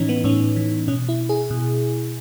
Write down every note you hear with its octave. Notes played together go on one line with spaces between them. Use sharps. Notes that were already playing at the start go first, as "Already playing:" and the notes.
Already playing: A2 E3 C#4 D#4
B3
A2 C#4
E3
B2 C#4
E4
G#4
B2